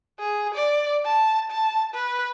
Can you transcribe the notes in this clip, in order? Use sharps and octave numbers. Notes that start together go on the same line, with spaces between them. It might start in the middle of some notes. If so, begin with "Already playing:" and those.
G#4
D5
A5
A5
B4